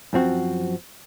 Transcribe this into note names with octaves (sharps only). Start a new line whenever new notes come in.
F#2 F3 C4 F#4